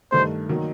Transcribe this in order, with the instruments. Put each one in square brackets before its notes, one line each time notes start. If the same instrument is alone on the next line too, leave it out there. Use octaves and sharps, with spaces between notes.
[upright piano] G2 D#3 A3 [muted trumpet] C5
[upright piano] D#3 F#3 A#3 D#4